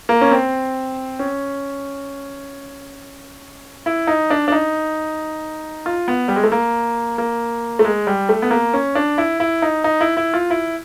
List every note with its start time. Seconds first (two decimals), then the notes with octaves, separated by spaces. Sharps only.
0.09 A#3
0.21 C#4
0.31 C4
1.19 C#4
3.86 E4
4.07 D#4
4.30 D4
4.48 D4
4.52 D#4
5.86 F4
6.08 B3
6.28 G3
6.36 G#3
6.44 A3
6.52 A#3
7.18 A#3
7.79 A3
7.85 G#3
8.07 G3
8.29 A3
8.42 B3
8.51 A#3
8.74 C#4
8.95 D4
9.18 E4
9.40 E4
9.62 D#4
9.84 D#4
10.01 E4
10.17 E4
10.34 F4
10.50 E4